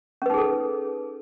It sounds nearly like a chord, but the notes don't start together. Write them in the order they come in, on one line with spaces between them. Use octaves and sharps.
C#4 B4 D#4 G#4 A4